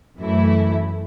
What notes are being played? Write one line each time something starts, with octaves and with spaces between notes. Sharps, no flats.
F#2 E3 A3 E4